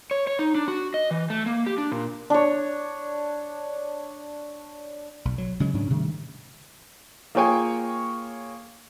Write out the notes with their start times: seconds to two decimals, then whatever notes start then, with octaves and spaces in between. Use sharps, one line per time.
0.11 C#5
0.27 C#5
0.39 D#4
0.55 D4
0.68 F#4
0.94 D#5
1.11 E3
1.30 A3
1.46 A#3
1.66 G4
1.78 D4
1.92 A#2
2.30 D4 C#5
5.25 B1
5.38 F#3
5.60 C#3 F#3 G#3
5.74 G#2 C#4 D4
5.90 C3 D#3 G3 A3
7.35 A#3 F4 G#4 C#5 G5 G#5